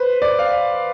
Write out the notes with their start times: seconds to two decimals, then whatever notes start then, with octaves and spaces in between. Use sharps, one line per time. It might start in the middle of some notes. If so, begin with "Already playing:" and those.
Already playing: B4 C5
0.22 D5
0.39 F5